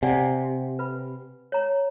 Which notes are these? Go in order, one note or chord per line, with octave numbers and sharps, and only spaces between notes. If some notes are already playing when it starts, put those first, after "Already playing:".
C3 D5 F#5 G#5
B4 B5
C#5 A#5